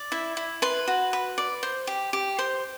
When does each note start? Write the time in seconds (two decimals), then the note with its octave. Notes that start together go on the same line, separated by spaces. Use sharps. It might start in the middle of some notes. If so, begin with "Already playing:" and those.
Already playing: D5
0.12 E4 E5
0.37 E4
0.62 B4 C6
0.88 F#4
1.13 B4
1.38 D5
1.63 C5
1.87 G4
2.13 G4
2.39 C5 C6